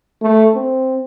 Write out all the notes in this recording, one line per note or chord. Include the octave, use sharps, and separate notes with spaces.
A3
C4